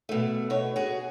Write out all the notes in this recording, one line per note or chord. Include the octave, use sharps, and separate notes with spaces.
B2 A3
B2 C#5
F#4 G#4